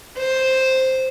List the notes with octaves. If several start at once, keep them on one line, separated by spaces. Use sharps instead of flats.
C5